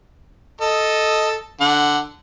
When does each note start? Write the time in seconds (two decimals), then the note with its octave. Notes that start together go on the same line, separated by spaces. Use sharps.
0.61 A4 D#5
1.61 D3 F#5